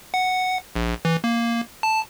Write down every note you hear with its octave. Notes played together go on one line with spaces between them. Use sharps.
F#5
A#1
E3
A#3
A5